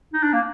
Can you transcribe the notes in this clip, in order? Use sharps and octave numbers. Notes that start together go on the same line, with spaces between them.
D#4
D4
A#3